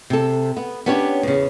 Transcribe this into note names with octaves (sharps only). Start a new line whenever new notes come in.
C3 A4
B3
B3 C#4 D4 G4 C#5
E2 C#3